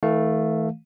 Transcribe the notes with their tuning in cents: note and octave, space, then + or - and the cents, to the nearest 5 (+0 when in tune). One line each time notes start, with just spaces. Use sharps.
E3 -40 A3 +0 F5 +10